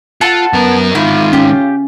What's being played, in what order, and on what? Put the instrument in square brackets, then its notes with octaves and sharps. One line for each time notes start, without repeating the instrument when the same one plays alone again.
[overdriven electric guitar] F4 [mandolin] A4 F#5 A5
[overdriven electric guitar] F#2 A#4 [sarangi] B3
[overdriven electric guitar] G#2 D#3 [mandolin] E4 [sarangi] F4
[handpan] C#4 [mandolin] G4